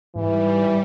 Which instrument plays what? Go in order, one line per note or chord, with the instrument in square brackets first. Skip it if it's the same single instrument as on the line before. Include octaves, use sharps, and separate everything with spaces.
[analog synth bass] G#2 [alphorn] E3 [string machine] G3